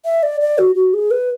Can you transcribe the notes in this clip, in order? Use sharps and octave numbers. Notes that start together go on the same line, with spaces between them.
E5
D5
D5
F#4
F#4
G#4
B4